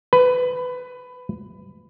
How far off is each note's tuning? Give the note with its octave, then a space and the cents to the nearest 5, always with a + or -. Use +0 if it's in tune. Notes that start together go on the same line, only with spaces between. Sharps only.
B4 +20